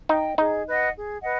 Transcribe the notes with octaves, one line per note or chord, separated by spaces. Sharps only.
D#4 D#5 G5
D#4 G#4
B4 D#5 F#5
G#4
B4 D#5 F#5